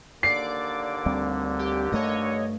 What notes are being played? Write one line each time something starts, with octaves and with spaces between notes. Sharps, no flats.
D#2 D3 A#3 D5 D6 C7
D2 G3 C4
G4
G2 A3 C#5 D#5